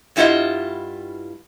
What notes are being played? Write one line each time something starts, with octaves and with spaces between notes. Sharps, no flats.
G2 G3 E4 F4 D#5 F#5